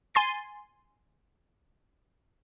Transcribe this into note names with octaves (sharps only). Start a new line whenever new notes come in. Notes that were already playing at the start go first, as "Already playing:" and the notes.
G#5 C6 A6 C7